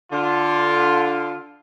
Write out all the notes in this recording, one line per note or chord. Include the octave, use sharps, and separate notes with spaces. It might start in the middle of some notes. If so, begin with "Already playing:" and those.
D3 F4